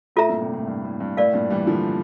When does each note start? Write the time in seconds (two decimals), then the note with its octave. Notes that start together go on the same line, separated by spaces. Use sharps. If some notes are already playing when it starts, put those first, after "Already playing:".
0.16 A2 F4 A4 E5 A#5
0.29 G2 A#2
0.42 A2 C3
0.54 A2
0.67 G2
0.84 A2
1.00 G2
1.17 A2 A#4 D5 F5
1.34 G2 A#2
1.50 E3 G3
1.67 D3 F3